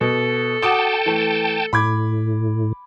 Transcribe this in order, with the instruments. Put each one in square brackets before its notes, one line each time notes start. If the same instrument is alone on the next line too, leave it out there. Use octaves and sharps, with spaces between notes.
[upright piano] B2 [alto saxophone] A4
[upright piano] F#4 D6 D#6 [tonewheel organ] G5 A5
[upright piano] E3 A3
[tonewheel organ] A2 [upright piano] B5 D6 G#6